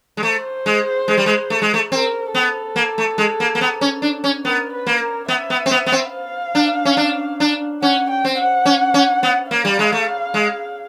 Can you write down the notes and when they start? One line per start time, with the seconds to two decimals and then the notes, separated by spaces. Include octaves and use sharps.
0.17 G#3
0.23 A3 C5
0.66 G#3
1.08 G#3
1.17 G3
1.26 G#3
1.50 A3
1.62 G#3
1.74 A3
1.92 C4 A#4
2.34 B3 A4
2.76 A#3
2.98 A3
3.18 G#3
3.40 A#3
3.55 A#3
3.61 B3
3.81 C#4
4.02 D4
4.24 C#4
4.45 B3 A#4
4.73 B4
4.86 A#3
5.01 A#4
5.28 B3 E5
5.50 B3
5.66 C4
5.71 B3
5.86 B3
5.92 C4
6.13 F5
6.55 D4
6.85 C#4
6.97 D4
7.40 D4
7.82 C#4 F#5
8.10 G5
8.25 C4
8.38 F#5
8.65 C#4
8.94 C#4
9.23 B3
9.50 A#3 F5
9.65 G3
9.79 G#3
9.92 A3
10.34 G#3